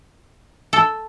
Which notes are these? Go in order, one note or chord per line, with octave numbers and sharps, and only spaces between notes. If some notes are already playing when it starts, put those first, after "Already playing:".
A4